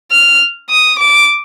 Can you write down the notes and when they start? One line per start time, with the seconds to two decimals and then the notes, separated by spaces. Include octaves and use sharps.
0.11 F6
0.70 D#6
0.99 D6